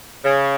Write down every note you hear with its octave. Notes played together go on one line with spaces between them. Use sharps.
C#3